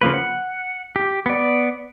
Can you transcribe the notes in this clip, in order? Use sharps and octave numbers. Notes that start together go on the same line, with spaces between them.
C#3 F3 A#3 B4
F#5
G4
B3 D5